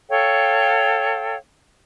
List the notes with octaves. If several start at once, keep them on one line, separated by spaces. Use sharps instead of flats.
A4 C#5 F5 G5